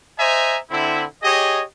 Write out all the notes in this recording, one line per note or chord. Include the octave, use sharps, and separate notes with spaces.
C5 D#5 E5 G#5 A#5
D3 C4 E4
G4 G#4 C#5 D#5